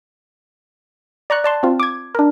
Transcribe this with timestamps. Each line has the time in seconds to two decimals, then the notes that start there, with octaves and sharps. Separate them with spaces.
1.30 D5 A#5 C#6 F#6
1.44 D5 A5 C6
1.63 C4 F4
1.80 D6 G#6
2.15 D4 A#4